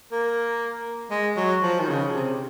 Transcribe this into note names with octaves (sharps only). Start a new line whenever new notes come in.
A#3
G#3
F#3
F3
D#3
C#3
C3